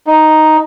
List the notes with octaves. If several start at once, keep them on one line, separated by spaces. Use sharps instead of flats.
D#4